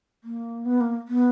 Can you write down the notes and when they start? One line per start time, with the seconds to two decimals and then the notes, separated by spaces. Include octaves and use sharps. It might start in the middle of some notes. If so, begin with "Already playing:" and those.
0.24 A#3
0.65 B3
0.81 A#3
1.08 B3